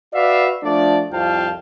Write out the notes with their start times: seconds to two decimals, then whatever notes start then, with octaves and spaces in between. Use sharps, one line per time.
0.14 F#4 B4 D5 E5 F5
0.63 F3 A3 D4 D5
1.12 C2 F2 F4 F5 G5 A5